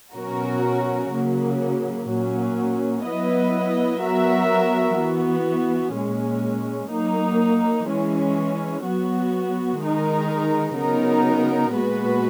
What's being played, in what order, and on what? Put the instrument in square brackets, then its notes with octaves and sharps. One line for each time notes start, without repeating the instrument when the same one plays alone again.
[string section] B2 F#3 C#4 F#4 A#4
C#3 F#3 A#3
A#2 F#3 A#3 C#4
F#3 B3 E4 B4 D#5
F#3 B3 F#4 A#4 E5
E3 B3 F#4
A#2 G#3 C#4
F#3 A#3 D#4
E3 G#3 C#4
F#3 B3 F#4
D#3 G#3 D#4 A#4
C#3 F#3 B3 D#4 A#4
A#2 G#3 B3 F#4 B4